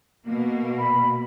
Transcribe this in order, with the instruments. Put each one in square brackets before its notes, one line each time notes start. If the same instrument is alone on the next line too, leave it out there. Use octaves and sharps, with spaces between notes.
[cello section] B2 A#3
[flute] B5